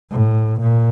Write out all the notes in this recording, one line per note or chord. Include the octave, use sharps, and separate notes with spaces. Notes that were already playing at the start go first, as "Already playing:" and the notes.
A2
A#2